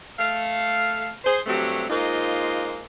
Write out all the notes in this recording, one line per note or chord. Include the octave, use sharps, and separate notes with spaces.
A3 F5
G#4 C5
G2 F#3 A3 C4 G4
G#3 A#3 D#4 F4 C5